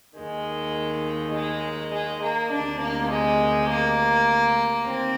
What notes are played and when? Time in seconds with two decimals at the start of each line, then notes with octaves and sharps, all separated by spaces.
0.17 D#2 D#3 G#3
1.35 G#3
1.93 G#3
2.23 A#3
2.52 D2 C3 D#3 D4
2.81 A#3
3.10 G#3
3.69 A#3
4.87 D#2 C4